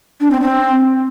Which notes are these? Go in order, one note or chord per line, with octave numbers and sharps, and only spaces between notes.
D4
C4
C4